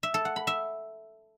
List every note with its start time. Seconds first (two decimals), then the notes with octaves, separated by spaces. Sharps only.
0.03 E5
0.14 A4
0.25 F#5
0.36 B5
0.47 E5